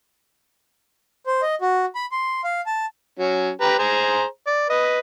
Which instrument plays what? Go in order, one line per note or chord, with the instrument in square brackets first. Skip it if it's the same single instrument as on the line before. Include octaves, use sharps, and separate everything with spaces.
[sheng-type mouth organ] C5
D#5
F#4
B5
C6
F5
A5
[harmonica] F#3 C#4
G4 B4 A#5
G#4 C5 A#5
D5
B4 D#5